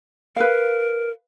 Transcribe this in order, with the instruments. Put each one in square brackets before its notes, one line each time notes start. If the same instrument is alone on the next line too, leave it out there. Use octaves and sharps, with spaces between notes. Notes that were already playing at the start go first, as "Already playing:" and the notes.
[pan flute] A#4 [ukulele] B4 F5